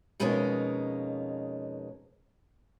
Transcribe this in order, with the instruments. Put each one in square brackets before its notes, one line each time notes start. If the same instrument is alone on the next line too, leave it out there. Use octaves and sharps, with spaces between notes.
[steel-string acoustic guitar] F2 B2 G#3 C#4 D#4 A#4